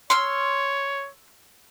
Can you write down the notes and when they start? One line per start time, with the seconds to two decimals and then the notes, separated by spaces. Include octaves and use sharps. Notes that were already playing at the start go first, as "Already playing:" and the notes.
0.10 C#5 C6 E6 F6